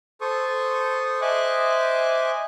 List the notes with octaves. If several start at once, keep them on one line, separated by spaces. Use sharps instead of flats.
A4 C5 C#6 D#6
C5 D#5 E5 G#5 D6 F#6